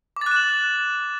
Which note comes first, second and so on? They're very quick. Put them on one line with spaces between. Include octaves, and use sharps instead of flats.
D6 A6 F#6 E7 F#7